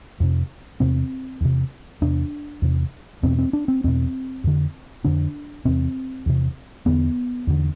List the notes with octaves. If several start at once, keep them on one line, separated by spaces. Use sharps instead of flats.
F2 C3
E2 C3 C4
E2 C3
E2 C3 D4
E2 C3
E2 B2 C4
C4
D4
C4
E2 B2 C4
F2 D3
F2 D3 D4
E2 C3 C4
E2 C3
E2 D3 B3
E2 D3